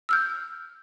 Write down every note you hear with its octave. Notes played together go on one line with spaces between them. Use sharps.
E6 F6 G6